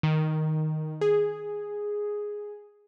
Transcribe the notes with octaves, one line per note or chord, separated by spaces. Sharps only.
D#3
G#4